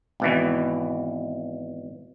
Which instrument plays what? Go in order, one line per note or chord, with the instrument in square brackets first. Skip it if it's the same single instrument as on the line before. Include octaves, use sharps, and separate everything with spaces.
[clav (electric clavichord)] G#1 B2 E3